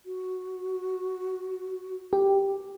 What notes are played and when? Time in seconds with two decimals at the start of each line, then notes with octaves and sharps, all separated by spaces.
0.06 F#4
2.13 G4